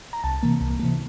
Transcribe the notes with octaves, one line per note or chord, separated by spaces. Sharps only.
A#5
C2 A5
C3 E3 A#3
C2
C3 E3 A#3